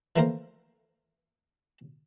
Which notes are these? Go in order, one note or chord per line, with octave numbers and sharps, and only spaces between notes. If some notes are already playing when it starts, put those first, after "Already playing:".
E3 F3 A3 A#3 A#4 C5